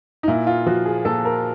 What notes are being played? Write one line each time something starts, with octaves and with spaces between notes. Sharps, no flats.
D#4
A#2 E4
F4
F3 F#4
G#4
A#2 A4
A#4